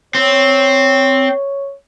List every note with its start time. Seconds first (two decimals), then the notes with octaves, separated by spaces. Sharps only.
0.15 C4 C#5